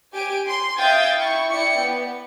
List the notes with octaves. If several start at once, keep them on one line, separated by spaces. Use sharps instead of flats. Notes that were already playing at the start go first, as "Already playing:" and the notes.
G4 G#5 D7
C6
E5 F5 G5 D#6 G#6 A6
E4 C#6
E4 D5 G5 C#7
B3